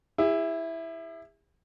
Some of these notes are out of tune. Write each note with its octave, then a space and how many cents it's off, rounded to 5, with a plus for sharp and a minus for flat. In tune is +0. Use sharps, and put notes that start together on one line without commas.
E4 +0 G#4 -45